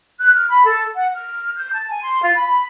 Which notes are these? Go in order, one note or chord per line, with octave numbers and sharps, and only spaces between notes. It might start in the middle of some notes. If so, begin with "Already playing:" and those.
F#6
F6
B5
A4
F#5
F6
G6
A5
G#5
C6
F4
B5